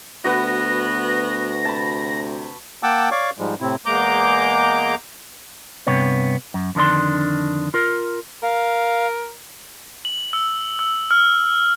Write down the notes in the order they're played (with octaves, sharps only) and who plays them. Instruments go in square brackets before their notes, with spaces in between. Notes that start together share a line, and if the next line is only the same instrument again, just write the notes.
[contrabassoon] D2 [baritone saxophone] B3 [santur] F#4 B4 [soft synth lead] A#6
[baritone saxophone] C3 [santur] A5 B5
[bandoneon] A#3 F#5 G5 A5 D6 E6
C#5 D5 F5 C#6 D6
G#2 F3 G3 G#3
A2 C3 C4 E4
[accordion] E2 G#3 A#3 A#5 D6 G6
[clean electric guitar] G2 C3 B3 C#5
F#2
F2 D3 D#3 D4 C6
F4 A#4
[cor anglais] A#4 [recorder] F5
[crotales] F#7
E6
E6
F6